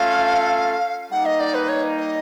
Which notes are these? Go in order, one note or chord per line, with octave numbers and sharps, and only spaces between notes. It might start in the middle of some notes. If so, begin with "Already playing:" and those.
Already playing: A3 C#4 F4 A4 F5
G3 A#3 D#4 F#5
D#5
D5
B4
C#5
D#5